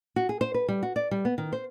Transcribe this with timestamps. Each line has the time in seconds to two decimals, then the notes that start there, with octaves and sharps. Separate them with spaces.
0.16 F#4
0.29 G#4
0.41 C5
0.54 B4
0.68 G3
0.83 F#4
0.96 D5
1.11 G3
1.25 B3
1.38 D#3
1.53 C5